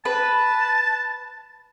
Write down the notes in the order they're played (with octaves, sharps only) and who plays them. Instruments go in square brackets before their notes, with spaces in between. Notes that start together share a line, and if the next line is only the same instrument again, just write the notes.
[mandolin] B4 [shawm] A5